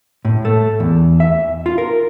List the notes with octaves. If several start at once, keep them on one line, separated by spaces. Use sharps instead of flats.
A2
A3
E2
E5
F4
A#4